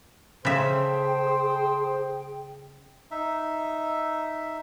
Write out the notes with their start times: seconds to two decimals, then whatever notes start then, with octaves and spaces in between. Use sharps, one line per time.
0.45 C#3 G#4 A4 C5 E5 G5
3.11 D#4 E5